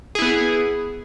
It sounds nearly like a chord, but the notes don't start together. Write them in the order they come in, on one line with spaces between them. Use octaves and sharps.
G#4 E4 B3